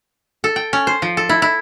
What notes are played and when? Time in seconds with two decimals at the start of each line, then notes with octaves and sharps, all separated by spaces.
0.44 A4
0.56 G5
0.73 C#4
0.87 C5
1.02 F3
1.17 A4
1.29 E4
1.42 E4